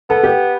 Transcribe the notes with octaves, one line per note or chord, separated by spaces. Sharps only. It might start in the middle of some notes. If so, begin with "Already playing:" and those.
B3 A4
G4